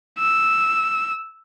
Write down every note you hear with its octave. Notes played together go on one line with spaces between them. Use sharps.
E6